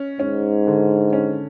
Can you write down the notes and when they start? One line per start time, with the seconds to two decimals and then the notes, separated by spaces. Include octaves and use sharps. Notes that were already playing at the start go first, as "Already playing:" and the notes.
Already playing: C#4
0.20 G#2 C#4
0.67 D3
1.13 C#4